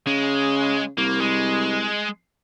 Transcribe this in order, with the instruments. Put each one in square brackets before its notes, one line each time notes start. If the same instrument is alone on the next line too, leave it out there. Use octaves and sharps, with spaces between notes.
[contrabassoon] C#3 [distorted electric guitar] G#3
[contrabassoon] C2 [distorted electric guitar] A#3
[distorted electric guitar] G#3